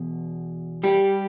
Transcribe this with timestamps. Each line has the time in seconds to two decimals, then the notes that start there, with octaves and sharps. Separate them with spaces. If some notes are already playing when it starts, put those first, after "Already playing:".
Already playing: E2 B2
0.83 G3 G4